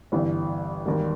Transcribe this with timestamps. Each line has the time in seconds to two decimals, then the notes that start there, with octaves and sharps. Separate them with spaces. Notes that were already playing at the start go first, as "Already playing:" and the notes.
0.12 G1 G2 E3 G3
0.85 E1 D#2 D#3 G3 A#3